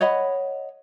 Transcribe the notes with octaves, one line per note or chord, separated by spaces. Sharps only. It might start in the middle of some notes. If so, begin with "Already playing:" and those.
C#5 D#5 F#5 B5